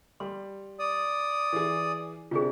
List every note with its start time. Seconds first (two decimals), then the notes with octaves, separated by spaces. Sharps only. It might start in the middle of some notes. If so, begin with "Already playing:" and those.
0.20 G3 C6
0.79 D5 D#6
1.53 E3 G#4
2.31 C3 D4 F4 G#4